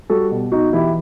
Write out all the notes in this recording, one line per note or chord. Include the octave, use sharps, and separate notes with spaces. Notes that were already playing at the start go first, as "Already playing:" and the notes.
G3 F#4 A4
B2
B2 D#4 F#4
E3 E4 G4